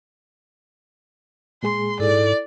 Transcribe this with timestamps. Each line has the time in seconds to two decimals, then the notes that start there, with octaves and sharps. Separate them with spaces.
1.63 A#2 G#3 G#4 C6
2.00 G#2 E4 A4 D5